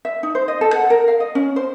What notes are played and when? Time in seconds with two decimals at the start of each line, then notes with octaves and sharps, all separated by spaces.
0.05 E5
0.23 D#4
0.35 C5
0.48 D#5
0.61 A4
0.74 F#5
0.90 A#4
1.08 F5
1.20 D#5
1.35 C#4
1.56 C5